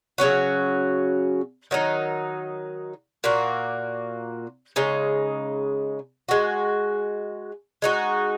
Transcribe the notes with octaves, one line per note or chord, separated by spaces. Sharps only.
C#3 F#3 C#4 F#4
D#3 F#3 D#4
A#2 A#3 F#4
C#3 G#3 D#4
G#3 F#4
G#3 D#4 F#4